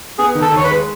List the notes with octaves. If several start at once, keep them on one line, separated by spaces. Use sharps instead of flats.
B3 G#4
D#3
A4
D#2 C#5
B4
G#3